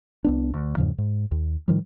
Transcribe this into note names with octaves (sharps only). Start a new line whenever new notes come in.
C2 B3 D4
D2
E2 G#2 C#3 F3
G#2
D#2
A2 D#3 F3 G3